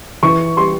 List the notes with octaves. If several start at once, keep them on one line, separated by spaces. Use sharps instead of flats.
E3 C#6
G3 C6